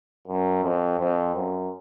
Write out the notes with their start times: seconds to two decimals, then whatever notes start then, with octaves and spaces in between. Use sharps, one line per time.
0.27 F#2
0.63 F2
0.99 F2
1.35 F#2